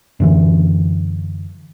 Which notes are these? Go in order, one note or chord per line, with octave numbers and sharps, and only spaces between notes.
F#2 D3 E3